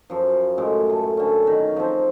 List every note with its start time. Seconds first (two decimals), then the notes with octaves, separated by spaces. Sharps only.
0.10 F#2 F3
0.58 F#2 A2 G#3
0.90 A3
1.17 D3 C#4
1.47 D#3
1.76 F3 C4